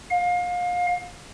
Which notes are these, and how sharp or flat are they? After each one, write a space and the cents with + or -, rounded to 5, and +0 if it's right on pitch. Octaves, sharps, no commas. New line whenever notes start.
F5 +30